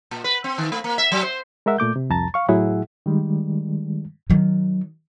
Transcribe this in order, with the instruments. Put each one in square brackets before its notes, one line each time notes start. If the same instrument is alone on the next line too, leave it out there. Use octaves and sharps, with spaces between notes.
[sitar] A#2
B4
C4
D#3
A3
A#3
E5
F#3
C5
[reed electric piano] G#3 A#4 E5 F#5
A#2 A3 D6 G6
C3
C2 F2 A5 A#5 A6
F5 C#6
A2 F#3 E4 G#4 E5 F#5
D#3 G3 G#3
[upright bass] D#3 F#3